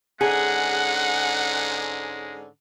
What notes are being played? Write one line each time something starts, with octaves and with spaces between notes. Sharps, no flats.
G#2 D3 G#3 C#4 G#4 F#5